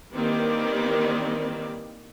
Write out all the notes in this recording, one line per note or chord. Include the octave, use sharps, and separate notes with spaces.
D#3 E3 G3 A#3 C4 D5